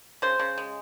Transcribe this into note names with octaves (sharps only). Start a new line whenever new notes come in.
C#3 C5
C#3
G#3